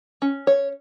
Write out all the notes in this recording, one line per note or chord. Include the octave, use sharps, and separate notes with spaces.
C#4
C#5